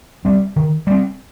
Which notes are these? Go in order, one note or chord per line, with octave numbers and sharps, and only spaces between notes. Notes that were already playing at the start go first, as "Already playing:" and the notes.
G3 C4
D#3
G3 C4